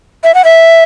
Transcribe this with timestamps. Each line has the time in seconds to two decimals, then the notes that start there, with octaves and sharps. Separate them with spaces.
0.24 E5
0.35 F#5
0.44 E5